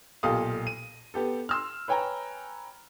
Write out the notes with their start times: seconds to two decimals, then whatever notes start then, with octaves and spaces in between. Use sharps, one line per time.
0.23 B1 A#2 G4 A4 F5 D#6
0.67 D#7
1.14 B3 G4 A4
1.49 C6 E6 F6
1.88 B4 C#5 G5 G#5 A#5